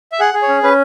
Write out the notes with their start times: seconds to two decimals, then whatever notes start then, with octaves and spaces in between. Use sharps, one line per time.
0.12 E5
0.20 G#4 F#5
0.34 G#4
0.42 C#5
0.48 C#4
0.63 C#4 B4